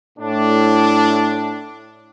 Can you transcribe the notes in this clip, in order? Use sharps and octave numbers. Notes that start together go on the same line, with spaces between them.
A2 D4